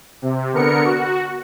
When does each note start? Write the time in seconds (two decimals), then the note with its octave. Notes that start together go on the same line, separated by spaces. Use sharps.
0.22 C3
0.53 D3 B3 A#4 C#7
0.84 F#4